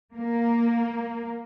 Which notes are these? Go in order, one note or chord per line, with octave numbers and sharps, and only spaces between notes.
A#3